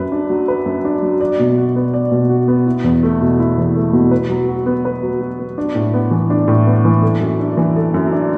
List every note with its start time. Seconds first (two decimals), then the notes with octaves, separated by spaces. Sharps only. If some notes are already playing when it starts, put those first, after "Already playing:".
Already playing: F#2 B4
0.12 D4
0.29 F#3
0.48 B4
0.66 F#2
0.85 D4
1.02 F#3
1.21 D5
1.39 B2
1.57 F#4
1.76 B3
1.93 D5
2.11 B2
2.29 F#4
2.48 B3
2.66 E4
2.84 E2
3.03 A3
3.21 B2
3.40 E4
3.58 E2
3.76 A3
3.93 B2
4.11 B4
4.29 F#3
4.49 F#4
4.66 B3
4.85 B4
5.02 F#3
5.21 F#4
5.39 B3
5.58 D4
5.75 A2
5.94 B3
6.11 E3
6.30 D4
6.48 A2
6.67 B3
6.85 E3
7.02 A4
7.21 F#2
7.40 D4
7.57 E3
7.76 A4
7.94 F#2
8.12 D4